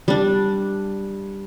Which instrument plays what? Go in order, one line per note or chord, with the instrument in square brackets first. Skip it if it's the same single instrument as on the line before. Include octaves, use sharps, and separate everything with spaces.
[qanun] G3 D4